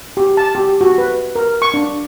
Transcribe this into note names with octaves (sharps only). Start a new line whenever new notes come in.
G4
A5
G4
F#4
B4
A#4
C#6
D4